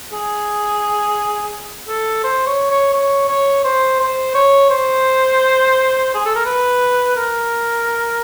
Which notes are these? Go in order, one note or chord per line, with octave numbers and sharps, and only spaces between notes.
G#4
A4
C5
C#5
C#5
C#5
C#5
C5
C5
C#5
C5
G#4
A4
A#4
B4
A#4